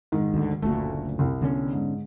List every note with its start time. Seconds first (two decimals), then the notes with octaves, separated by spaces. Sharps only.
0.12 G#2 D#3
0.34 D2 D3
0.62 F#1 D2 A#2 A3 F#4
1.19 C2
1.42 D3 B3 C#4
1.73 G#2